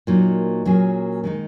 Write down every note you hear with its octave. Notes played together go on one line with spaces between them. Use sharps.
A#2 F#3 A#3 D#4
A#2 F#3 A#3 C#4 G#4
D#3 G#3 D#4